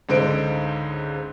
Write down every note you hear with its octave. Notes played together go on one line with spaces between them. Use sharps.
C#2 G#2 D3 D#4 C5 D7